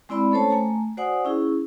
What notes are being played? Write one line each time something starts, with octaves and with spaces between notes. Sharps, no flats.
G#3 C4 E4 D5 B5 E6
A3 C#4 A4 C5 C#5 A5
A3 G#5 A#5
F#4 C5 D5 F#5 G#5 D#6
C#4 E4 G#4